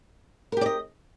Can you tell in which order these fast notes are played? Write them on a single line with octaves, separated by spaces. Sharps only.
A#4 G4 D5 D#5